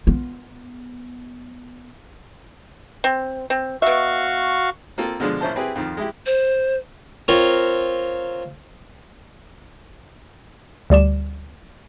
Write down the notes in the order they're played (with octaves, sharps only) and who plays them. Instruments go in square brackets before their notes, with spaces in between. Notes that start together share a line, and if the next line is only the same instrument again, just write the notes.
[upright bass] B3 F4
[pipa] C4
C4
[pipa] B2 E5 [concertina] F#4 F5 C#6
[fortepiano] A#3 C4 F4 A4
B2 D3 F3 G#3 D4
A#1 C#4 E4 C5 A5
C4 E4 G4 G#4 B4
F2 D#3 F3
G#3 E4 G4
[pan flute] C5
[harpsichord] C4 F4 A#4 C#5
[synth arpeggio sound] D2 G3 D5 E7